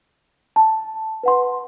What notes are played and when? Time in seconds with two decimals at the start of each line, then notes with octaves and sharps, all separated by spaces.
0.56 A5
1.23 B4 F#5 C6